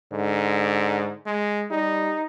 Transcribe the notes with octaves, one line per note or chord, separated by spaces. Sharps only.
G#2 D3
G#3
G3 D#4